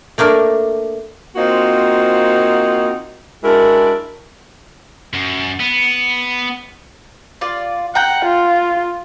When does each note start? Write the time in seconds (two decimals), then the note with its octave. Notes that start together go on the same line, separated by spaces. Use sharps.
0.18 A3 A#3 D4 A#4
1.36 A#3 C4 D#4 F4 F#4 C5
3.43 G#3 D4 E4 F#4 A#4
5.14 F#2
5.60 B3
7.41 F4 D5
7.95 F#5 G5 A#5 G6
8.25 F4